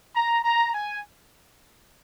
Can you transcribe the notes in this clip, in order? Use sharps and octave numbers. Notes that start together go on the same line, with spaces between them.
A#5
A#5
G#5